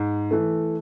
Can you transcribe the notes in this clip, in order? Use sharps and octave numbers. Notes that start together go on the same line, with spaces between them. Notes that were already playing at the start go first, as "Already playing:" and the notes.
Already playing: G#2
E3 A3